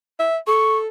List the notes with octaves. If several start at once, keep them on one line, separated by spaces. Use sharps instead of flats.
E5
A4 C#6